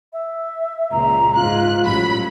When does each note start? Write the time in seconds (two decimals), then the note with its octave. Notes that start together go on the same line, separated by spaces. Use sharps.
0.13 E5
0.91 C#2 A#2 A#5
1.36 G#2 F4 F#6
1.83 A1 F#3 B5